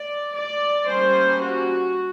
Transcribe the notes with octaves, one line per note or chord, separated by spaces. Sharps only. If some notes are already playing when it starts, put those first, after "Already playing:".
Already playing: D5
D5
G3 A#3 C#4 C5
F#4